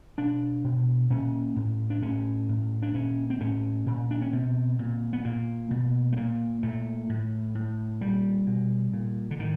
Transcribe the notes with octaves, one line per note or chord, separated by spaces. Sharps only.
B2 D4
B2
A#2 C#4
A2
D4
A2 C#4
A2
D4
A#2 C#4
C4
A2 C#4
A#2
D4
C#4
B2 C4
A#2
B3
A#2 A#3
B2
A3
A#2 A#3
A#2 A3
A2
A2
A#2 G3
B2
A#2
D3
A2 D#3